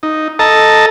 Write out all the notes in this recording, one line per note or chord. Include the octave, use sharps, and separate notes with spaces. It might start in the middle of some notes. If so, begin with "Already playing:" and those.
D#4
A4 D#5 A5 A#5